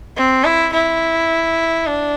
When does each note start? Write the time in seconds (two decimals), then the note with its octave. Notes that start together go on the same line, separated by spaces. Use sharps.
0.17 C4
0.45 E4
0.73 E4
1.86 D4